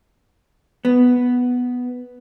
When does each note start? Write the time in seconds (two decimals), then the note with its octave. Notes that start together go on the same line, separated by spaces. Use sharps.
0.85 B3